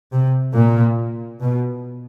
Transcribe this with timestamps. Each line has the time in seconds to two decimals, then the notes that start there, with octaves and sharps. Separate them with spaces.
0.12 C3
0.54 A#2
1.41 B2